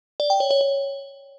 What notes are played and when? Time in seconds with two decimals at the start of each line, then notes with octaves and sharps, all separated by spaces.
0.20 D5
0.30 G5
0.40 C#5
0.51 C#5
0.61 C#5